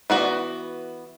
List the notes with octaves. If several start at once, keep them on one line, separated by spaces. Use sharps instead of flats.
E3 B3 F#4 D5